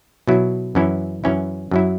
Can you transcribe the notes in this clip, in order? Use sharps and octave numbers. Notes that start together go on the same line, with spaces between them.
B2 F#3 E4
F#2 E3 C#4 E4
F#2 E3 C#4 E4
F#2 F#3 E4